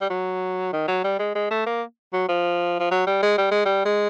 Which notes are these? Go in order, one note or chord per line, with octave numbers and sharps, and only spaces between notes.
G3
F#3
D#3
F#3
G3
G#3
G#3
A3
A#3
F#3
F3
F3
F#3
G3
G#3
G3
G#3
G3
G#3